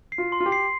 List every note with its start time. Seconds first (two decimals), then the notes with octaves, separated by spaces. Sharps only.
0.12 C7
0.18 F4
0.32 C6
0.40 F4
0.46 G4
0.52 C7